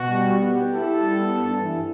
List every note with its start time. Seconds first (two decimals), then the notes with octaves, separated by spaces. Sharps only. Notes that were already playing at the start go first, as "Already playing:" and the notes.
Already playing: B2 F#4
0.09 G3
0.31 B3
0.52 G4
0.74 E4 A4
0.95 G3
1.16 B3
1.38 G2
1.60 E3